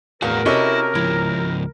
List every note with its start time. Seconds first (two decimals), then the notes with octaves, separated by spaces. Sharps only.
0.22 E2 A2 F#4 A#4 F5
0.46 C3 C#4 E4 F#4 A4 D#5 E6
0.95 C#2 F3 E4